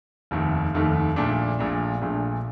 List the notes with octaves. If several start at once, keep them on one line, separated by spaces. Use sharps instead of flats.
F1 D#2 D#3 A3
F1 D#2 D#3 A3
A#1 A#2 A3 D4
A#1 A#2 A3 D4
A#1 A#2 A3 D4